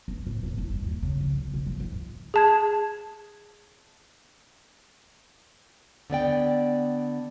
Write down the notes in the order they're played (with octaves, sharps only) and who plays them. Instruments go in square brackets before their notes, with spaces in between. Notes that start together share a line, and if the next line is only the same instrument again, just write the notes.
[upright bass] G2
A2
D#1
E4
G2
D#2
C#3
F3
C#3
B2
F3
G#2
[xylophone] G#4 A5 G#6
[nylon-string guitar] D3 B3 D5 G5